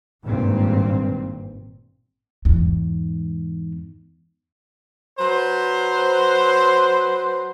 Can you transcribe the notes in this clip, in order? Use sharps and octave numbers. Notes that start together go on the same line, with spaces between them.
G#1 G2 A#2 C4
E2 G#2
F#3 B4 C5